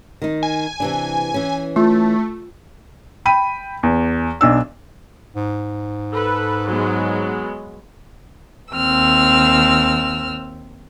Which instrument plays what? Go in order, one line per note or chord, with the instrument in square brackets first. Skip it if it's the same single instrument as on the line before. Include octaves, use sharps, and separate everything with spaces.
[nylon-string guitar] D#3 D#4
[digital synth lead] G#5
[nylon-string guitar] C3 E3 D4
E3 C#4
[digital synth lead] A3 [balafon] F4
[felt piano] G5 B5 D#7
E2
B1 D4 E6
[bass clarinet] G#2
[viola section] A4 B4
F#3 G#3 B3
[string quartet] D#2 C4 E6 F6